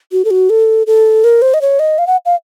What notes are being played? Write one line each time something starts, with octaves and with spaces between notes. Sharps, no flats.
F#4
A4
F#4
A4
A4
A#4
C5
D#5
C#5
D#5
F5
F#5
F5